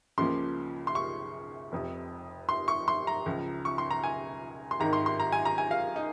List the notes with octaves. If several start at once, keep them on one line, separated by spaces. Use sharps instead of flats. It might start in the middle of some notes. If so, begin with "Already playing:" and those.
C#2 C#3 F3 A#3 C6
C6
C#6
F1 F2 C3
C6
C#6
C6
A#5
C#2 C#3 F3
C#6
C6
A#5
G#5
C6
G#1 G#2 D#3 A#5
C6
C6
A#5
G#5
A#5
G#5
F5
D#4